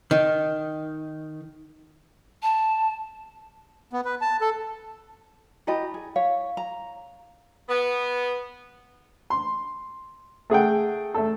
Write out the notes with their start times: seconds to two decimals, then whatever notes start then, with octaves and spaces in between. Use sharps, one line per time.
0.11 D#3
2.43 A5
3.93 B3
4.05 B4
4.21 A5
4.41 A4
5.67 E4 F#4 G4 D#5 A5 B5
5.94 G#4
6.16 C#5 F5
6.57 A#5
7.68 B3
9.30 C6
10.50 A3 G#4 F#5 G5
11.14 A3 A4